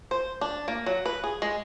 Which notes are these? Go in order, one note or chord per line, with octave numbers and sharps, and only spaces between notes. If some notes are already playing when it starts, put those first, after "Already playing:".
C5
D4
A#3
F#3
B4
G#4
G#3